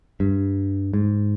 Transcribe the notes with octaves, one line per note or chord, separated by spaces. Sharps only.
G2
G#2